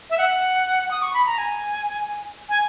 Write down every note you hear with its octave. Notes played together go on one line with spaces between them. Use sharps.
E5
F#5
D#6
C#6
B5
A#5
G#5
G#5